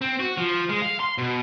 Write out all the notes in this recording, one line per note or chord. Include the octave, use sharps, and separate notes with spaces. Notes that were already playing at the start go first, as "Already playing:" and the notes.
C4
F#4
F3
G#3
F5
C6
B2